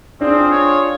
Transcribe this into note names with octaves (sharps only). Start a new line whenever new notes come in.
C4 D4 F4 G#4
C#5